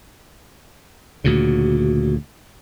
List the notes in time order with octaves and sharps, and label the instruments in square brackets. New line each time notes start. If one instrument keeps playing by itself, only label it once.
[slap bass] D2 A#2 C#3 [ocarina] F#4